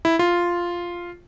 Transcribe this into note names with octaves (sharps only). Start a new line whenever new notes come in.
E4
F4